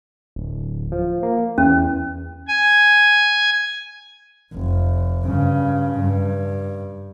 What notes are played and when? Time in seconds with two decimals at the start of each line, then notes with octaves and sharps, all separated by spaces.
0.36 D1
0.92 F3
1.23 A#3
1.58 E2 C#4
2.48 G#5
4.53 F1
5.25 G2 C#3
5.98 G2